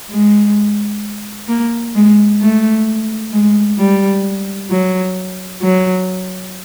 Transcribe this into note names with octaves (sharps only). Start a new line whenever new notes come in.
G#3
A#3
G#3
A3
G#3
G3
F#3
F#3